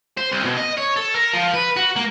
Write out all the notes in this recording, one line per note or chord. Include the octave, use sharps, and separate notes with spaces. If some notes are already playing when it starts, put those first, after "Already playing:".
C5
C2
B2
D#5
C#5
A4
A#4
F3
B4
F#4
A#3